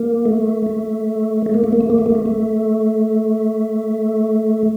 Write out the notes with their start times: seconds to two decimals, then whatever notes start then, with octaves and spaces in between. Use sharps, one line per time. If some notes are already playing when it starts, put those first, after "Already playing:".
Already playing: A#3
0.25 A3
0.66 A3
1.46 A3
1.54 A#3
1.64 A3
1.73 A#3
1.81 A3
1.90 A#3
1.98 A3
2.06 A#3
2.15 A3
2.26 A3